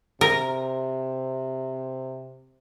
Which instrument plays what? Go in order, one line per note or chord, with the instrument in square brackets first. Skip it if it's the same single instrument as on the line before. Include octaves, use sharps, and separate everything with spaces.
[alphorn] C3 [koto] A#4